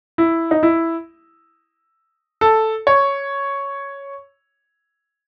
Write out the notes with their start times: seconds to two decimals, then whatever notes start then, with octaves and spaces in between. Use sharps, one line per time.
0.18 E4
0.51 D#4
0.63 E4
2.41 A4
2.87 C#5